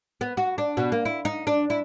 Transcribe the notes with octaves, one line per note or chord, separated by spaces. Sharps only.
B3
F#4
D4
B2
A#3
E4
D#4
D4
E4